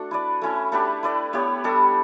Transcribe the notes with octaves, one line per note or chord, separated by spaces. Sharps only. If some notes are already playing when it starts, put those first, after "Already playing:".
Already playing: A3 D4 F#4 A4
E4 B4 D5
A3 C#4 E4
A3 D4 G4 B4
E4 B4 D5
B3 E4 G4 C#5
G3 D4 A4 E5